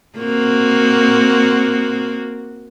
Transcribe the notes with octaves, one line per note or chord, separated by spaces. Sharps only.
A#3 C4 F#4